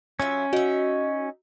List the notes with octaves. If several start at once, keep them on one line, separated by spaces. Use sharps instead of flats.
F#3 C#4 F4 E5
D#4 F#4 E5